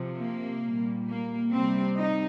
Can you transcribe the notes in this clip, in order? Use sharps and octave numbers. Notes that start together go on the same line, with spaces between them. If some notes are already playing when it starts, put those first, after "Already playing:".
Already playing: C3 F3
A#3
A#2 G3
A#3
C3 G3 C4
D#4